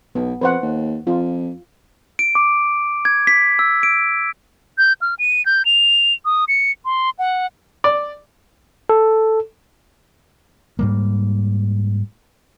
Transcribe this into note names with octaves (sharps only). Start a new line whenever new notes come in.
B1 B3
F2 B4 C5 F#5
D#2
F2 F4
D7
D6
G#6
B6
E6
D7
G6
F6
D#7
G6
F7
D#6
C#7
C6
F#5
D5
A4
G#2 G3 A#3